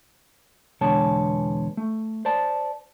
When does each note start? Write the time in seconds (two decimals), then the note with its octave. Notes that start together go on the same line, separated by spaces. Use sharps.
0.81 E2 B2 D3 G#3 C#5 A5
1.77 A3
2.25 C5 D5 A5